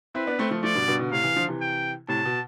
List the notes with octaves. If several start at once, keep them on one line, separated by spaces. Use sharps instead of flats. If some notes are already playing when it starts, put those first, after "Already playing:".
C4 E4 B4
B3 D4
A3 C4
F3 A3
F3 A3 D5
G2 B2
G2 B2
B2 D3
A2 C3 F5
C3 E3
D3 F3
C3 E3
G5
A2 C3 A5
B2